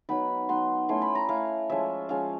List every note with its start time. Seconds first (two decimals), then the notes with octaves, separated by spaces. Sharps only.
0.09 F#3 B3 D#4 B5
0.48 F#3 B3 D#4 C6
0.89 A3 C#4 E4 C6
1.02 B5
1.15 A#5
1.29 A3 C#4 E4 F5
1.69 F3 G#3 C#4 F4 E5
2.09 F3 G#3 C#4 F4 F5